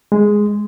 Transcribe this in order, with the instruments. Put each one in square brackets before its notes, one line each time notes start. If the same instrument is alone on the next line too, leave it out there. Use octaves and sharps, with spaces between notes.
[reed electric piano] G#3